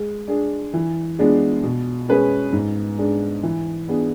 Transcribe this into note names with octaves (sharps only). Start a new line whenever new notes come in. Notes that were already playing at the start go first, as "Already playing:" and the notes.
Already playing: G#3
D4 G#4
E3
G#3 B3 D4 G#4
B2
G#3 C#4 G#4 B4
G#2
G#3 D4
E3
B3 D4 G#4